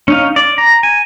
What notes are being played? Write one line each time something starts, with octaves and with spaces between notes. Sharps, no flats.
C#4 D#4 F5
D5
A#5
G#5